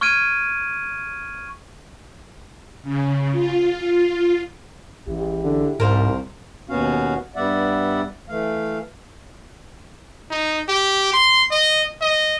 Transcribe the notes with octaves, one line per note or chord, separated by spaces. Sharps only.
C#6 F6 G#6 D7 D#7
C#3
F4
A1 G#3 E4 G4
D3
C2 G#2 A#4 C5 F5
D#2 B2 B3 C#4 F#4 F5
G2 G3 B3 D5 E5 F#5
E3 A3 F5
D#4
G4
C6
D#5
D#5